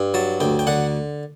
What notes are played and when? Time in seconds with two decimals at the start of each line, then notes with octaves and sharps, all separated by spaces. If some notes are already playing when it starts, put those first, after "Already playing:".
Already playing: G2
0.14 F#3 A5
0.40 D2 G5
0.59 G5
0.67 D3 F#5